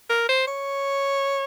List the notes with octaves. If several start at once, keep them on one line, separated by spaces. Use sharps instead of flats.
A#4
C5
C#5